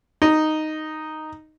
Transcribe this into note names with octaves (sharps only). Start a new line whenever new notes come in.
D#4